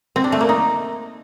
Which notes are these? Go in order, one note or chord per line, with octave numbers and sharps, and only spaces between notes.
C4
D4
A3
A#3
D#4